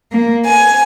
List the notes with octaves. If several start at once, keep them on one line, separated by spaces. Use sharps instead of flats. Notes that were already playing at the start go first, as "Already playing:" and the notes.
A#3
G#5